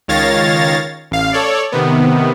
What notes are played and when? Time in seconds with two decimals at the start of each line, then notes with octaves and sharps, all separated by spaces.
0.08 C#2 D#3 C#5 F5 A6 A#6
1.11 A1 F5
1.33 A4 C#5 D5
1.72 C3 D#3 B3